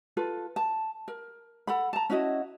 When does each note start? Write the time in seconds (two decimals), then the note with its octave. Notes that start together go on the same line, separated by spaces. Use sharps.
0.17 F4 A4 B4
0.56 A5
1.08 A#4
1.67 A4 F#5 B5
1.93 A5 A#5
2.10 C#4 E4 F#4 D#5